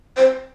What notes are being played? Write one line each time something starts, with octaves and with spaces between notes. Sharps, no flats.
C5